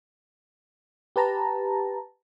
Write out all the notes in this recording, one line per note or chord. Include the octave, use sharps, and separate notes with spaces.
G4 B4 A5 A#5